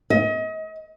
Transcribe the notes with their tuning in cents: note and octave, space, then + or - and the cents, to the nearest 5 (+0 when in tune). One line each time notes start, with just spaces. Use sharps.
D#5 +35